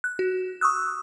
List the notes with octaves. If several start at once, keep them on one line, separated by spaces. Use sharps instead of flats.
F#6
F#4
C#6 D#6 E6 F#6